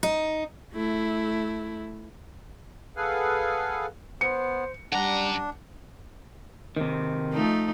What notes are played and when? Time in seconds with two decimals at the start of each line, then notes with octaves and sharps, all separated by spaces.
0.03 D#4
0.73 A3 E4
2.96 G#4 A4 B4 F5 F#5 G#5
4.21 B3 C5 C#7
4.92 F#2 G3 D4 F#5 A#5
6.76 C3 D#3
7.32 F3 A3 D#4